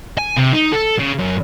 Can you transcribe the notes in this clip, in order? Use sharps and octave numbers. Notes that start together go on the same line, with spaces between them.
G#5
C3
D#4
A4
C#3
F#2